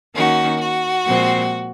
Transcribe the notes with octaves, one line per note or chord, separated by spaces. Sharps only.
D#3 A#3 C#4 F#4
F#4
A#2 F3 G#3 C4